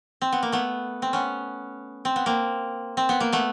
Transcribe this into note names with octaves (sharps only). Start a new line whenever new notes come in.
C4
B3
A#3
A3 B3
C4
B3 C#4
C4
B3
A#3 C4
C4
B3
A#3
A3 B3